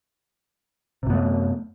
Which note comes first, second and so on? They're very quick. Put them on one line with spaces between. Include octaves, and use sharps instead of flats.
C3 F#2 B3 A3